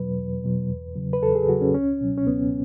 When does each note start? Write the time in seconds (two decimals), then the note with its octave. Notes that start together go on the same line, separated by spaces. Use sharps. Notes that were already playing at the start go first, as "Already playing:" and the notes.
Already playing: E2 B2 F#3 B4
0.18 E2
0.44 B2 F#3
0.69 E2
0.95 C#3 F#3
1.13 B4
1.23 E2 A4
1.35 G#4
1.49 C#3 F#3 F#4
1.61 C#4
1.74 C#2 C#4
2.01 B2 F#3
2.18 C#4
2.27 C#2 B3